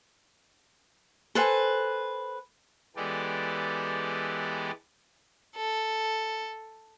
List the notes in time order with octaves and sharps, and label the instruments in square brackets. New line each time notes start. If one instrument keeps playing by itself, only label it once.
[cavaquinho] A4 B4 C5 G#5
[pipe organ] E3 G#3 B3 G4 A4 D5
[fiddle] A4